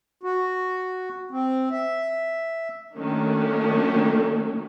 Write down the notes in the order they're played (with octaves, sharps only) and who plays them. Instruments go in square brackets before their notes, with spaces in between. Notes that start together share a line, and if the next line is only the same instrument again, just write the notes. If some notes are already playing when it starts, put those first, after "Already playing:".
[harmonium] F#4
C4
E5
[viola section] D#3 F#3 A3 A#3 C#4 D4